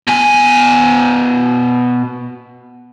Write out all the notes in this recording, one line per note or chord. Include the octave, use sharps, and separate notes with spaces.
B2 G#5